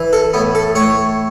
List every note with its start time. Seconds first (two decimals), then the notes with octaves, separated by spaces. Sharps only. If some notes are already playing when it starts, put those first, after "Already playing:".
Already playing: E3
0.13 A4
0.33 A2 B3
0.55 A4
0.75 A2 C#5